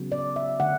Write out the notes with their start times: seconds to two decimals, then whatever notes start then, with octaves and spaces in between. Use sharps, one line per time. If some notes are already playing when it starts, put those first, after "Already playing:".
Already playing: C#3 F#3 B3
0.12 D5
0.36 E5
0.60 D3 A3 F#5